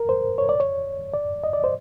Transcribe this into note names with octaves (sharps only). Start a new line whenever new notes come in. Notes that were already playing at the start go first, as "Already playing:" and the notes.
Already playing: A#4
C5
C#5
D5
C#5
D5
D#5
D5
C5